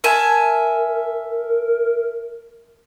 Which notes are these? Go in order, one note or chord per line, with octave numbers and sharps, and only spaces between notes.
A#4 E5 G#5 A5